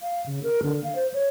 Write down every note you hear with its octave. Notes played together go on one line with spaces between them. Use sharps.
F5
C#3
A#4
D3
F5
C5
C#5